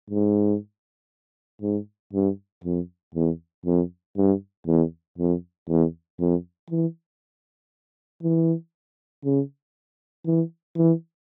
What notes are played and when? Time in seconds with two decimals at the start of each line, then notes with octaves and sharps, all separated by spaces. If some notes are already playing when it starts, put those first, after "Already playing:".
0.10 G#2
1.62 G#2
2.13 G2
2.64 F2
3.15 E2
3.66 F2
4.17 G2
4.67 E2
5.18 F2
5.68 E2
6.20 F2
6.70 E3
8.23 E3
9.25 C#3
10.26 E3
10.76 E3